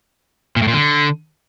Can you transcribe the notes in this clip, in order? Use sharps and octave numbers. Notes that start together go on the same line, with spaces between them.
A#2
A2
A#2
D3